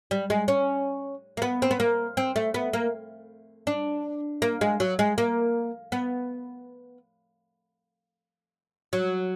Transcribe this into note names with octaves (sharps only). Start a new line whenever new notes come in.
G3
G#3
C#4
A#3
B3
C4
B3
A#3
C4
A3
B3
A#3
D4
A#3
G#3
F#3
G#3
A#3
B3
F#3